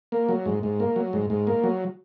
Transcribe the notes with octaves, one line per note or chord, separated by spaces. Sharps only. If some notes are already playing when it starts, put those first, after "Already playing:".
A#3
F#3
G#2
G#2
A#3
F#3
G#2
G#2
A#3
F#3